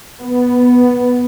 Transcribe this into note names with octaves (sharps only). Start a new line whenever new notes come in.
B3